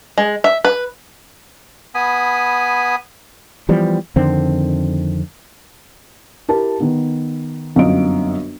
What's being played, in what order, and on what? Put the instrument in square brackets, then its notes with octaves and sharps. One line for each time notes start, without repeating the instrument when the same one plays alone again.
[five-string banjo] G#3
E5
B4
[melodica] B3 G#5 B5 D#6
[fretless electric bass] E3 F3 G3 B3
F2 D3 D#3 C4
[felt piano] E4 G4 A#4 A5
D#3 B3
G1 F#2 C4 D#5 F5 D7